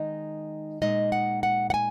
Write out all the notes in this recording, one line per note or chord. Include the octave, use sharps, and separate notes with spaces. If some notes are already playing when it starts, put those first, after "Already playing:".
Already playing: D#3 G#3 D#4 D#5
A#2 G#3 D#4 D#5
F#5
F#5
F#5
G#5